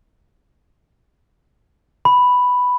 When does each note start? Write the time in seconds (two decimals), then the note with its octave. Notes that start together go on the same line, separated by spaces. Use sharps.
2.05 B5